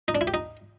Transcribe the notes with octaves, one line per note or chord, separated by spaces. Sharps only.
D#4
D4
E4
G4
D#4